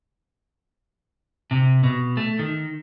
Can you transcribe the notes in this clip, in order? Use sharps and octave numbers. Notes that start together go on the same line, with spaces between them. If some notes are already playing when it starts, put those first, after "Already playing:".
C3
B2
A3
D#3